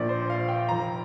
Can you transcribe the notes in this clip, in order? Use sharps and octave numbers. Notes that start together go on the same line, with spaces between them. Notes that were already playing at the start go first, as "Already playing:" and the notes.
Already playing: A#1 A#2 F3 D5
C5
F5
G5
F1 F2 F3 A#5